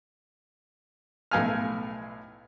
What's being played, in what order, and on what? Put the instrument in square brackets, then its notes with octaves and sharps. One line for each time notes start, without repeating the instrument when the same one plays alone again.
[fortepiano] B1 A2 F5 G#5 E6 F6